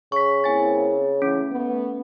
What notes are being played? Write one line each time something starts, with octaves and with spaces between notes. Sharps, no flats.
C#3 C#6 B6
A#3 C4 E4 G#5 A6
E3 A3 C#4
A3 B3